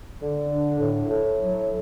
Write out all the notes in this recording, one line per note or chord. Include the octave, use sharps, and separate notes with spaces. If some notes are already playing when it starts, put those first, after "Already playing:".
D3
D4
A2
A2
F#3